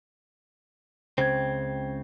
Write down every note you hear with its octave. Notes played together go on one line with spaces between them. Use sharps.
C#2 C#3 C4 C5 G5 G#6